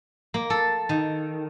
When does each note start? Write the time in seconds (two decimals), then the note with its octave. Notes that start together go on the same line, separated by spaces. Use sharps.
0.34 A#3
0.50 A4
0.89 D#3